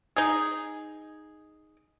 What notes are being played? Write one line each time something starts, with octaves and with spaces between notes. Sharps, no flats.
D#4 G#4